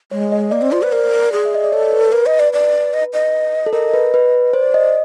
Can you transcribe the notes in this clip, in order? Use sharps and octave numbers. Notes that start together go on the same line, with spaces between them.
G#3 C#5
D#5
A#3 D5
C4
F4 C5
B4
A#4 D5
G#4
E5
D#5
D5
A4 C#5
B4
A#4 B4
D#5
D5
D5
D#5
D#5
A4
A#4 D#5
B4
B4
C5 D5
D#5